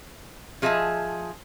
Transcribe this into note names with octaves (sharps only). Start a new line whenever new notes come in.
F3 G#4 D#5 E5 G#5 A5